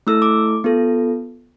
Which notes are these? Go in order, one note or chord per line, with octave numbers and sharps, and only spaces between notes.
A3 E4 A4 E6
D6
B3 F4 A4